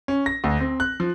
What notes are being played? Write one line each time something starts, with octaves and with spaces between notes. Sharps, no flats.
C#4
A#6
D2
C4
F#6
F3